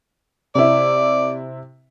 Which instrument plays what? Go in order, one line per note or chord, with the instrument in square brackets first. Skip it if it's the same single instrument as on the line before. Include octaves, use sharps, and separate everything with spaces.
[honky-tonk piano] C3 E4 [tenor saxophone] D5